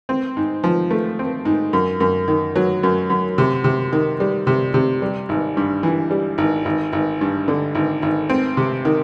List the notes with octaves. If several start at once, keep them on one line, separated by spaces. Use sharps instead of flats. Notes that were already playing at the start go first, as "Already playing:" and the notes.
C4
G#2
F3
A3
C4
G#2
F#2
F#2
D#3
F#3
F#2
F#2
C3
C3
D#3
G3
C3
C3
G3
G#1
G2
E3
G3
G#1
G#1
G#1
G2
D3
G#1
G#1
C4
C3
D#3